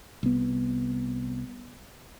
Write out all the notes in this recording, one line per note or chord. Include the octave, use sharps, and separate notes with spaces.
C2 B3